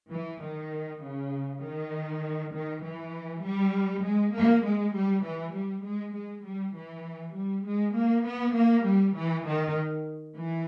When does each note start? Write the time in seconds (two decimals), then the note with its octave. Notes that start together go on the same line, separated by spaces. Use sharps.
0.12 E3
0.42 D#3
1.02 C#3
1.63 D#3
2.53 D#3
2.83 E3
3.43 G3
4.04 G#3
4.34 A#3
4.64 G#3
4.94 G3
5.24 E3
5.54 G3
5.85 G#3
6.15 G#3
6.45 G3
6.75 E3
7.34 G3
7.65 G#3
7.95 A#3
8.25 B3
8.55 A#3
8.85 G3
9.15 E3
9.46 D#3
10.36 E3